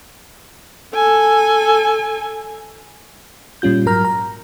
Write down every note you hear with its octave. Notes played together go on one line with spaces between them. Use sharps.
A4 G#5
A#2 G3 C#4 F4 G6
G#2 F#3 A#4 A#5 F6
A#5